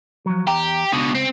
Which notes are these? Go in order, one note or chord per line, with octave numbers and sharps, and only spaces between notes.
F3 F#3
E2 G4 G5 A#5
C#2 B2 D3
C4